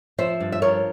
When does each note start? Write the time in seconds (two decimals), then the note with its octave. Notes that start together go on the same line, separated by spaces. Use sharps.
0.18 F3 C5 E5
0.40 G2
0.52 E5
0.62 F3 A#4 C#5